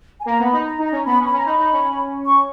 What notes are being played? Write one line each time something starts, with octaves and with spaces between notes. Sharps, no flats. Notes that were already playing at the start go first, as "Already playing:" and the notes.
G#5
A#3 A#5
B3
B5
D#4
A#5
D#4
A#5
C#4
B3 B5
C#4
B5
C#4 A#5
D#4 B5
D#4
C#4
C#6